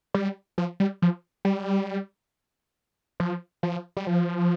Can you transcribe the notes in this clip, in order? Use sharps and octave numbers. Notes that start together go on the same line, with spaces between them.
G3
F3
G3
F3
G3
F3
F3
G3
F3